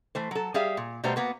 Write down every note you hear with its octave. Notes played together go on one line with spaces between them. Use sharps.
E3 A3 C5
F#3 A4
G3 G#4 E5 F5
A#2
B2 G3 A3 B3 C5 A#5
A#3 B3 F#4